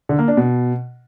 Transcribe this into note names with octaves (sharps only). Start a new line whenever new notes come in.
D3
A#3
D4
B2